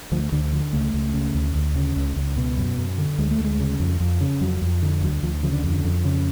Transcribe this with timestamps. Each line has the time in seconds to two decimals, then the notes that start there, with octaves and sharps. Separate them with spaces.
0.12 D2 F3
0.32 D2 D3
0.52 D3 F3
0.73 C#2 A3
0.94 C#2
1.14 C#3
1.35 D2
1.55 D2
1.75 C#3
1.96 C#2
2.16 C#2
2.37 B2
2.57 F#2
2.78 F#2
2.98 D3
3.18 D2 G#3
3.31 A3
3.39 D2
3.44 G#3
3.60 C#3
3.80 F2
4.00 F2
4.21 C#3
4.41 F2 F#3
4.62 F2
4.82 D3
5.02 D2 F#3
5.23 D2 F3
5.43 C#3 F3
5.53 D3
5.64 F2
5.71 D3
5.84 F2
6.05 C#3